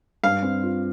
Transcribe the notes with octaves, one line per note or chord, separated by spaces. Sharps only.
G2 F5
C4
F4